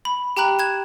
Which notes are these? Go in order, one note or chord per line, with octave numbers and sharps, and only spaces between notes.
B5
G4 G5 A#5 B5 F#6 F#7
F#6 G#6 E7